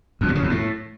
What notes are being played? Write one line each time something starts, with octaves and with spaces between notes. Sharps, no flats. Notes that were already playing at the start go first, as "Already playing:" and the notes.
F2
A#2
C#3
E2
A2